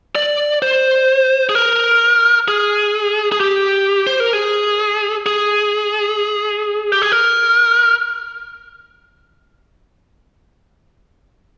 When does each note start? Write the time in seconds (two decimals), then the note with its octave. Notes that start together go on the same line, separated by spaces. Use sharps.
0.15 D5
0.62 C5
1.49 G#4
1.55 A#4
2.48 G#4
3.32 G#4
3.40 G4
4.07 C5
4.20 A#4
4.33 G#4
5.26 G#4
6.92 G4
7.02 G#4
7.12 A#4